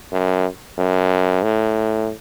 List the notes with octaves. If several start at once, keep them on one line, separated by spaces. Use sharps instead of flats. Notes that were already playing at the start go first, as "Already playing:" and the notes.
F#2
F#2
A2